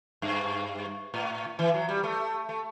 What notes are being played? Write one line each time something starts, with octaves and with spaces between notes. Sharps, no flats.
G2
A2
E3
F#3
G3
A3
A3